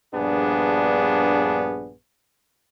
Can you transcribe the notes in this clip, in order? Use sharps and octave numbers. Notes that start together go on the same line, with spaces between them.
A#1 G2 B3 D4 G#4